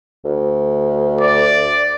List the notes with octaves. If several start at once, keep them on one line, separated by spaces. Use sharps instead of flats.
D2
D5